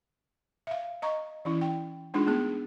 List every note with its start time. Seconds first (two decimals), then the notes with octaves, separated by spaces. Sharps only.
0.67 E5 F5
1.02 D#5 A#5 C#6
1.45 E3 C#4 E4
1.61 G5
2.14 G#3 D4 D#4 F4 G#4
2.27 A3 B3 G#4